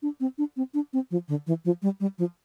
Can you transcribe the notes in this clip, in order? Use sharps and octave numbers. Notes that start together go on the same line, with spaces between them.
D4
C4
D4
C4
D4
C4
F3
D3
E3
F3
G3
G3
F3